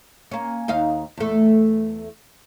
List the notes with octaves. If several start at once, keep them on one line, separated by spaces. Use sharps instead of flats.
A#3 C#4
D#2 D#4 F5
E2 A3